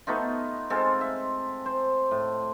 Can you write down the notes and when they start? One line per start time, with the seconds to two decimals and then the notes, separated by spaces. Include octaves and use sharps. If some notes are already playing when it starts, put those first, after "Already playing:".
0.07 A3 B3 D#4 F4
0.70 G#3 C4 F4 A4
1.01 E5
1.66 C5
2.11 A2